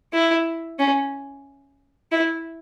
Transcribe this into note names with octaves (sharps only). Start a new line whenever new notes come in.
E4
C#4
E4